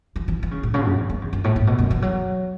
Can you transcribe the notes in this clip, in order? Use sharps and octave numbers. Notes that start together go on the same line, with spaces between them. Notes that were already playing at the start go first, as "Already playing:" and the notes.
E3
E3
E3
C#3
A2
C#3
F#2
E2
F#2
E2
F#2
A2
A2
B2
F#2
E3
F#3